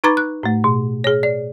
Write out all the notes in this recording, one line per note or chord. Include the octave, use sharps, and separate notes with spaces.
D#4 B4 A#5 B5 D6 A6
F#6
A2 A3
B2
G#4 C#5
D5